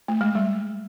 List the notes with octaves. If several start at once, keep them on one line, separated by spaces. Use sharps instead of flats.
A3
G#3
G3